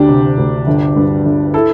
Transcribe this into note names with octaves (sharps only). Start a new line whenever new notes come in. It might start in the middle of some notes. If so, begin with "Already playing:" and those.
Already playing: D2 D4 G4
C3
D2
G1
G2
G1
E4 A4